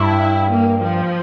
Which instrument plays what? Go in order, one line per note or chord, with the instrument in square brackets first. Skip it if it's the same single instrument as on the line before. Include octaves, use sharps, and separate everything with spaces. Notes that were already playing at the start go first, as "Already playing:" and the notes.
Already playing: [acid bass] G2 [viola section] E4
[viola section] A#3
F3